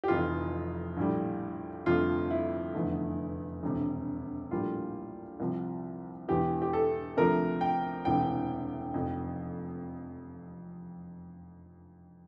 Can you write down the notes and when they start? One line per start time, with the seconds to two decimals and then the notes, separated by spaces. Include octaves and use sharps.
0.04 G4
0.08 F1 F2 E3 F4
0.97 A#1 A2 G3
1.86 G1 F2 C3 F3 A3 F4
2.30 E4
2.74 F1 E2 D3 A3
3.63 E1 D2 C3
4.51 A#1 A2 G3 A#3 F4
5.40 C2 C3 F3
6.28 E1 E2 E3 G4
6.62 G4
6.73 A4
7.17 D2 C3 F3 A3 A#4
7.61 G5
8.05 E1 D2 C3 E3 G5
8.94 F1 F2 C3